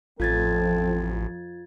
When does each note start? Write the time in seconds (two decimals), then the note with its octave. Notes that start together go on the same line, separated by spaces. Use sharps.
0.20 A1 F2 F3 C4 F4 A4 G#6 A6